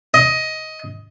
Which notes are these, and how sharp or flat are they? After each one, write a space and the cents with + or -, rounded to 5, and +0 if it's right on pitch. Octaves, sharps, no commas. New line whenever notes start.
D#5 +15